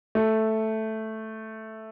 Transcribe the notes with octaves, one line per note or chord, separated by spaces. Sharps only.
A3